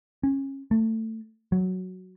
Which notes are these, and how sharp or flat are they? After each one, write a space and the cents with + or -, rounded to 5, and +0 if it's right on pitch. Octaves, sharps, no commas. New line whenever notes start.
C#4 -25
A3 +20
F#3 +0